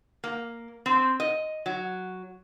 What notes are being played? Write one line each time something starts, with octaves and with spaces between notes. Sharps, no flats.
A#3
C4
D#5
F#3